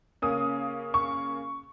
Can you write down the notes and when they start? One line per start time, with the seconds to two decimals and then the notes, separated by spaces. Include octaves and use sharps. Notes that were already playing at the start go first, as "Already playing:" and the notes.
0.22 C#3 A#3 C#4 D#6
0.94 C#6